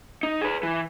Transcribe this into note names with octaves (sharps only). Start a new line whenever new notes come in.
D#4
G#4 B4
E3